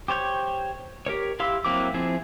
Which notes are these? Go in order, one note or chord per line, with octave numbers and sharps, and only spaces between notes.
G4 C5 C#5 G6
G4 A#4 C#5
E4 G4 F5 C6 E6
F#3 A#3 C4 E4 D6
F3 C4 E4 G#4